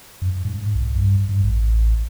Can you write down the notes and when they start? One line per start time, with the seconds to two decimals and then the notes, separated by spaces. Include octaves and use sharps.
0.22 F#2
0.45 G#2
0.75 B1
0.96 G2
1.29 G2
1.43 A1